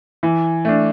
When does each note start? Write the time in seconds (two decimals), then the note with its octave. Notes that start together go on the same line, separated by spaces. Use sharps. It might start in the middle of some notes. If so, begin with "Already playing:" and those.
0.23 E3
0.65 A3 D4